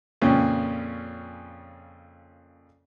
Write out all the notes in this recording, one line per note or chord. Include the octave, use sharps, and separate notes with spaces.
F2 A#2 C#3 C#4